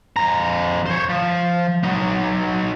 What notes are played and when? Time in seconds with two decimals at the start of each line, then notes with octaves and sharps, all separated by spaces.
0.17 F2 A#5
0.86 C5 C#5
1.09 F3
1.84 F#3 D#4